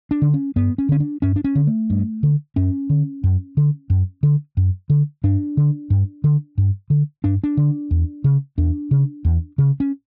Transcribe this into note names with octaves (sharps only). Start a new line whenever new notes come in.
D4
D3
C#4
G2 B3
C#4
D3 C#4
D4
G2 C#4
D4
C#4
D3
A3
G2
D3
F#2 C#4
D3
F#2
D3
F#2
D3
F#2
D3
G2 D4
D3
G2
D3
G2
D3
G2 D4
D4
D3
E2
C#3
E2 D4
C#3
E2
C#3
C#4